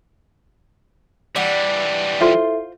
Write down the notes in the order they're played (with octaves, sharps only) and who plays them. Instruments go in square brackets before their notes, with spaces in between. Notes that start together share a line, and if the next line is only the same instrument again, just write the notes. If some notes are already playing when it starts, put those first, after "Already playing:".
[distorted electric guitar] E3 G3 [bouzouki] D4 F#5
[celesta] E4 A4 E5 [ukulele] F4 C5